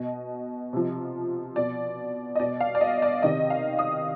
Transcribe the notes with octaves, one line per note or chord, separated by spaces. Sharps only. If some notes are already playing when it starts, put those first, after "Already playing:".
Already playing: B2 D#5
C3 F3
B2 D5
D#5
B2 D5
F5
D5
D#5
D5
C3 D#3 D#5
F5
D#6